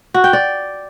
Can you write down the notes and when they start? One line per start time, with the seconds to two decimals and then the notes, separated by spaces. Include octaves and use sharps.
0.14 F#4
0.24 G5
0.33 D5